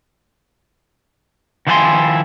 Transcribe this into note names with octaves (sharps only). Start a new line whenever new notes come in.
D#3 F3 E4 F#5 G#5 C6